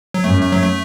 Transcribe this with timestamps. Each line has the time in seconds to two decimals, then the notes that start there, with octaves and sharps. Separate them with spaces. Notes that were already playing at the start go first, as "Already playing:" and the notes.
0.14 F#3
0.23 F#2 A3
0.41 A3
0.52 F#3
0.62 A3